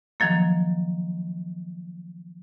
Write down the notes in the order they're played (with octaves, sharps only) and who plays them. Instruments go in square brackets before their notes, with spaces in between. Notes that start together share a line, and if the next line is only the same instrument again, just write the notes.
[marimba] D#3 F3 F#3 A#3